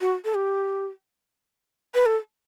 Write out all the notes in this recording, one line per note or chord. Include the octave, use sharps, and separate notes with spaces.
F#4
A4
G4
B4
A4